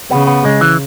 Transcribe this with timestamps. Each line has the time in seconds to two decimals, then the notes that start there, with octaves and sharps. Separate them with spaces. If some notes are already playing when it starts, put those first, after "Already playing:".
0.10 C#3 B3
0.27 B3
0.45 G#3
0.61 E3